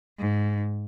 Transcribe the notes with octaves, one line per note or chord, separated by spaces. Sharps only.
G#2